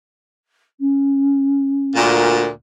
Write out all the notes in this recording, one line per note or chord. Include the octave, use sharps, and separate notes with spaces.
C#4
D2 A#2